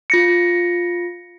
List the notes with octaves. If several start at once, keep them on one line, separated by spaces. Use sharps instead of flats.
F4 A#6 C#7